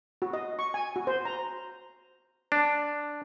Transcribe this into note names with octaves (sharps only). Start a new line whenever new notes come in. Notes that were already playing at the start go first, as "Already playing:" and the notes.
F#4
D#5
C#6
G#5
F#4
C5
A#5
D4